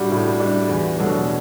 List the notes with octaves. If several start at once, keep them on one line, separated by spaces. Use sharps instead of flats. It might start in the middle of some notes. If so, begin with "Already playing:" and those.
Already playing: A2 G3 D4 F#4 G4
A2
G3 D4
E2
B2 F#3 A3 D4